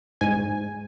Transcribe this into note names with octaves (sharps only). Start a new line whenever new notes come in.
G#2 G#5